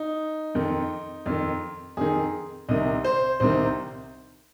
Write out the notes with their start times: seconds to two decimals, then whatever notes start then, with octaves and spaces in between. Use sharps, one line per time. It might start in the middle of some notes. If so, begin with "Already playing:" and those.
Already playing: D#4
0.55 F2 D#3
1.26 F2 D#3
1.97 F2 D#3 G#4
2.69 C2 C3 D#3 D#5
3.04 C5
3.40 C2 C3 D#3 C5